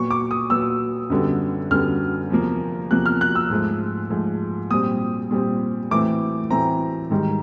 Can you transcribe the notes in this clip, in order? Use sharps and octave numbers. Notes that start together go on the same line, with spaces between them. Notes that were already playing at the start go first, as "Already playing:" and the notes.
Already playing: A#2 F#3 B3 C#6
D6
D#6
A#2 F#3 B3 E6
F#2 D3 G3 B3
F#2 D3 G3 B3 F6
E2 C3 F3 A#3
E2 C3 F3 A#3 F#6
F6
F#6
E6
G#2 F3 A3
G#2 F3 A3
A#2 G3 C4 D#6
A#2 G3 C4
A2 E3 A3 C4 D6
A2 E3 A3 C4 A#5
G#2 D#3 G3